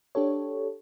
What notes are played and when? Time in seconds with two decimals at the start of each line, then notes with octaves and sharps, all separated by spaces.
0.15 D4 G4 A4 C#5